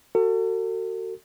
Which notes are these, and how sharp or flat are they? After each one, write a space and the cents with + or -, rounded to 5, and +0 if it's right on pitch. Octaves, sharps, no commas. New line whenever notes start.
F#4 +15 A4 +40